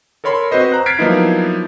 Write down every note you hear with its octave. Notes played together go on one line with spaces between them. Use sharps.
A4 A#4 C#5 B5 C6
C4 F#4 B4 C5 D#5
A#5 F#6
F6 G#6 A6 B6 C7 D7
F3 F#3 A#3 B3 D#4 E4